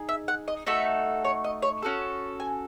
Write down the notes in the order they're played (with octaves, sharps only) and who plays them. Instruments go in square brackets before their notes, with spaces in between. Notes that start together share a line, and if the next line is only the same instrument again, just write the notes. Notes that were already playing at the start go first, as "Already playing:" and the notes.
Already playing: [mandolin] D#4 G#4
E5
F#5
D#5
A3 D#4 F#4 A4 E5
C#5
D#5
C#5
C#4 F#4 A4
G#5